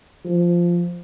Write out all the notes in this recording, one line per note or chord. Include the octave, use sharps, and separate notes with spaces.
F3